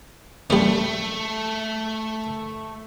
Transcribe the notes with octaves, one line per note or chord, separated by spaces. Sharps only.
G3 A3 C#4